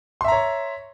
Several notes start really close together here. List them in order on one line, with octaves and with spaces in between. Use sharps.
C6 E5 A#5 C#5